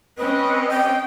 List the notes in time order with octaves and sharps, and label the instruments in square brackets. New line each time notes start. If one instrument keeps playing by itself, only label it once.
[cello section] C4 C#4 D#5 [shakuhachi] B4
[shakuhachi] G5